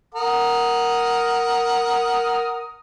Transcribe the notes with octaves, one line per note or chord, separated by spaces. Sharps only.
A#4 F#5 D#6